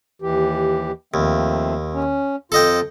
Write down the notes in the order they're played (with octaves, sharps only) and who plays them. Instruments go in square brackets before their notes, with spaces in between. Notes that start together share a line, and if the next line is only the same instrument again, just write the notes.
[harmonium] D#2 E3 G4
[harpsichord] D#2 [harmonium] F3 A3 C4
[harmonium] C#4
[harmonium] F2 F4 [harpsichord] A4 D#5 G5